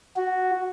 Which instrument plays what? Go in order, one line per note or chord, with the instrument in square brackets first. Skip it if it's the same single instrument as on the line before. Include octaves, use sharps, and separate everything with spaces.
[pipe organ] F#4